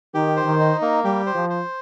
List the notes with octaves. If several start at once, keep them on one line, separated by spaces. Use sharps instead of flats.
D#3 G4
C5
D#3
D#4
A#3
G3 G4
C5
F3
C5